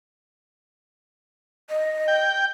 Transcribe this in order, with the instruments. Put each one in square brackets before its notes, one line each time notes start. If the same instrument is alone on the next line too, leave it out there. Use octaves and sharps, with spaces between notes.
[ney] D#5
[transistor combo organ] G5